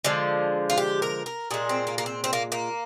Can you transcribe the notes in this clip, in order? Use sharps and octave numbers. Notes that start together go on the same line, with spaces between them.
D3 F3 G#3
F4
G4
A#4
A#4
A#2 G#3 G#4
C4
A#3
A#3
C4
C4
A#3
A#3